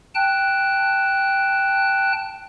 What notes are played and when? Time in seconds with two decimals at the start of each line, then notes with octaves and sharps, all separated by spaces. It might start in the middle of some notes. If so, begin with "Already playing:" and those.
0.15 G5 A5 F#6